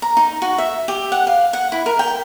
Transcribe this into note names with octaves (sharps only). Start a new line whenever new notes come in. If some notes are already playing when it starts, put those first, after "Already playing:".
A#5
D#4
F#4
E5
G4
F#5
F5
F#5
E4
A#4
G5